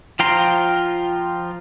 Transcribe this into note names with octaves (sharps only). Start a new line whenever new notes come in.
F3 F4 G5 A#5 C6